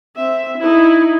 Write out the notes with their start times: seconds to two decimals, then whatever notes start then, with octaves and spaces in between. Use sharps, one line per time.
0.16 C4 E5
0.58 D#4 E4